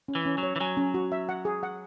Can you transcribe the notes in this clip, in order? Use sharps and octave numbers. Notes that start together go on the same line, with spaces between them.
C#4
E3
C#4
F#3
C#5
E3
F#3 G#5
C#4
F#4
E5
F#5
G#4
F#5